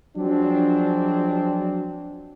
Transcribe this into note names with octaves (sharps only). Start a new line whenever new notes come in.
F3 F#3 G#3 C4 D4